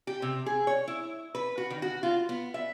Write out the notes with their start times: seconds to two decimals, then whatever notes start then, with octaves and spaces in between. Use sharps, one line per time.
0.07 G4
0.22 C3
0.46 G#4
0.67 C#5
0.88 E4
1.35 B4
1.58 F#4
1.70 D#3
1.82 F#4
2.03 F4
2.29 B3
2.54 E5